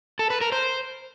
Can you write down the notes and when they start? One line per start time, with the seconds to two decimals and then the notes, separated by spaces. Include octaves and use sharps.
0.19 A4
0.30 B4
0.41 A#4
0.52 C5